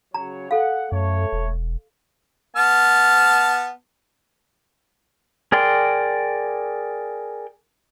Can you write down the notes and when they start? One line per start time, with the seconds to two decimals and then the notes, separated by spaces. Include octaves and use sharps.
0.14 C#3 F#3 C#5 A#5
0.51 A4 F5 F#5
0.92 F#2 A3 C#5
1.32 E1
2.56 B3 A5 F6
5.52 G#4 A#4 D5 G5 C6